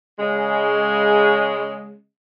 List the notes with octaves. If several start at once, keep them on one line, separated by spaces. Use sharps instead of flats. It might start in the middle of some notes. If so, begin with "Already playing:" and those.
C#3 G#3